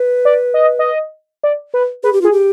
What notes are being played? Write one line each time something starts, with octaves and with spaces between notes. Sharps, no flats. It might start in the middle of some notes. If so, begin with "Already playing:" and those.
Already playing: B4
D5
D#5
D#5
D5
B4
G#4 B4
G4
F4 G#4
G4